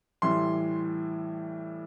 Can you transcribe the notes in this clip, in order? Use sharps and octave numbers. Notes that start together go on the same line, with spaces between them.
A2 E3 G3 C6